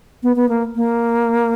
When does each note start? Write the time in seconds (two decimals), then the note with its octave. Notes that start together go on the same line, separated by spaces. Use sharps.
0.23 B3
0.36 B3
0.49 A#3
0.76 A#3